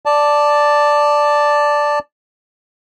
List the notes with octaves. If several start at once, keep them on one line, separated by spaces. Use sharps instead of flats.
D5 A5